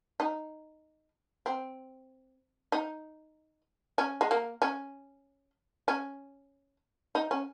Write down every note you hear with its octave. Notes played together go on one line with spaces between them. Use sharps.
D#4
C4
D#4
C#4
G#3
A#3
C#4
C#4
D#4
C#4